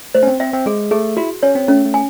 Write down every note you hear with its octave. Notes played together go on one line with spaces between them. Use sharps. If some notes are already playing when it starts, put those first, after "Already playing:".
A3 C5
C#4
C4
C4 E5
C4
G#3 G#4
A3 G#4
E4 F#4
C#4 C#5
C4
A3 C#4
A3
G#5